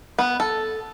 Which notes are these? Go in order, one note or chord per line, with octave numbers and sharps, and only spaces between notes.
B3
A4